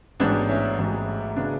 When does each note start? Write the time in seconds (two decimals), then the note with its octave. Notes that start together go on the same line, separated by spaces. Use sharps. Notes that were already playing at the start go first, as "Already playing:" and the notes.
0.20 A1 G#2 F#3 B3 D4
0.49 C#4 E4
0.79 A1 G#2 F#3
1.36 C#3 F#3 B3 D4